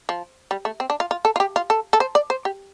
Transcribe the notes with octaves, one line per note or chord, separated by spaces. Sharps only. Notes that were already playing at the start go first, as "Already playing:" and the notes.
F3
G3
A3
C4
D4
F4
F4
A4
F4
G4
F4
A4
A4
C5
D5
C5
G4